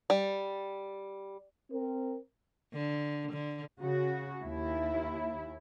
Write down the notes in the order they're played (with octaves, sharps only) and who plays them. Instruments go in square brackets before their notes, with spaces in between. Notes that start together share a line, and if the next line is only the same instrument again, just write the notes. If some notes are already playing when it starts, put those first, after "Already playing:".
[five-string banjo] G3
[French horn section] C4 A#4
[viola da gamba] D3
D3
[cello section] C#3 F#4
D#2 E4